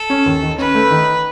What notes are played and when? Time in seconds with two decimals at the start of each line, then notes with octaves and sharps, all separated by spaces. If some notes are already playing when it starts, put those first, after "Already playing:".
Already playing: A4
0.10 C#4
0.26 D#2
0.42 D#3
0.58 C#4 B4
0.75 A3
0.90 D#3